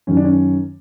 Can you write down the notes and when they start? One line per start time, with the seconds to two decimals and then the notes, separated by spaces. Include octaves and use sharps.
0.07 F#2 D#3 F#3 C#4
0.17 D4
0.24 C#4